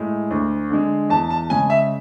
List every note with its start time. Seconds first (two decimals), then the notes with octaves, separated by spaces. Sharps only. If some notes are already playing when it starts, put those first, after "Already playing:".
Already playing: A2 G#3
0.30 D2
0.70 D3 G#3
1.10 E2 A5
1.30 A5
1.50 C#3 G#3 G#5
1.70 E5